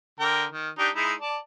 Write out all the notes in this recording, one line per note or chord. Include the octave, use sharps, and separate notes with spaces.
D3 A#4 G5
D#3
D4 D#4 G4
G#3 D#4 E4
D5 A5